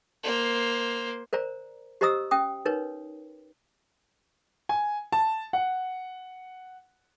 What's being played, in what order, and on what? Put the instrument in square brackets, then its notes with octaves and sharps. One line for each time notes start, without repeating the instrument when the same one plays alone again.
[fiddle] A#3 C5
[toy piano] A#4 C5 D5 A#5
G4 C5 D#5 A#5 D#6 E6
C#4 G5 D#6
D#4 A#4 B4 C#5
[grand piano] G#5
A5
F#5